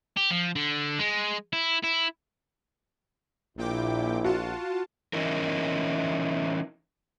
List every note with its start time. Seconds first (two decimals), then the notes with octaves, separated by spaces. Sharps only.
0.17 G4
0.31 F3
0.55 D3
1.00 G#3
1.53 E4
1.83 E4
3.58 A#1 A#2 E4 G5 D6
4.24 F4 F#4 A5
5.13 E3 C#4 D#4 E4 A#4